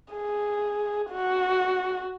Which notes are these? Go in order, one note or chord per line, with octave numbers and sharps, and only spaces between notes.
G#4
F#4